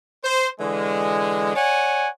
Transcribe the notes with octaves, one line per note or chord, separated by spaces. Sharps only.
C5
D3 E3 G#3
C#5 D5 F#5 G#5